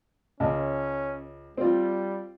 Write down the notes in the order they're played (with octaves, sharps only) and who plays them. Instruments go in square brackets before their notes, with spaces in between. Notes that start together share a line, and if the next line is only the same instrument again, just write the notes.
[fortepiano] C#2 A5 [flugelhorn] C#4
[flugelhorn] G3 [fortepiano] C4 F4